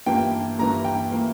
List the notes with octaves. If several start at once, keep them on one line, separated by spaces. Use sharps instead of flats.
G2 E3 A#3 G5
G2 E3 A#3 A#5
G5
E3 A#3